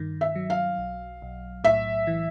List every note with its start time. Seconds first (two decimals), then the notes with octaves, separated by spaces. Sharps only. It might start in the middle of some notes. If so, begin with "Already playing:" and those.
Already playing: G2 D#3
0.21 E5
0.35 F#3
0.50 F5
0.78 B1
1.22 B1
1.64 A2 E5
2.07 E3